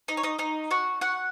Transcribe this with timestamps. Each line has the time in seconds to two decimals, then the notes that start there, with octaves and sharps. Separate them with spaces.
0.08 D#4 D#5
0.17 C#5
0.23 D#4 D#5
0.39 D#4 D#5
0.71 F#4 F#5
1.01 F#4 F#5